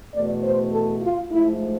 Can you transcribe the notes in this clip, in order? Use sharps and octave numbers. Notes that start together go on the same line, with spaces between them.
E2 B2 A3 D5
C5
A4
F4
G#2 F3 A3 E4